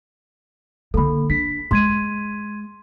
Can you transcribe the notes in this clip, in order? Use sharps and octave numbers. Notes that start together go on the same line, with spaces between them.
D3 A#3 A4 B5
D4 B6
G#3 C6 G#6 D#7